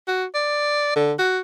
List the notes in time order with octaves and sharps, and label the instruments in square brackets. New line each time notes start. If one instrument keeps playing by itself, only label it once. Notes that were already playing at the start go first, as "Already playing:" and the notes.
[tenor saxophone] F#4
D5
D3
F#4